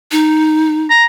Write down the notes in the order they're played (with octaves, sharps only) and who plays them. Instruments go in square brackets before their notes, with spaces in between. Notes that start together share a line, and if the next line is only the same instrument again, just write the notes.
[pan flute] D#4
[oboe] A#5